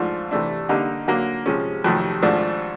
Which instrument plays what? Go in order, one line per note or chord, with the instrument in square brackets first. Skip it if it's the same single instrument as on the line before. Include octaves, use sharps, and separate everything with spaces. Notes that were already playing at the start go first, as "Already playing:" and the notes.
Already playing: [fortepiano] G#2 F3 A3 D4 F4
C3 E3 A3 D4
D3 G3 A#3 D#4
D3 F#3 A#3
C3 F3 G#3 C#4
F2 C3 D#3 F#3 A3
G#1 G#2 F3 A3 D4